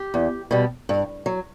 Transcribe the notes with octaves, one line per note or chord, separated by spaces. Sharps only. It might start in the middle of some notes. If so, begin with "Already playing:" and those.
Already playing: G4
E2
B2 G3
G2
F#3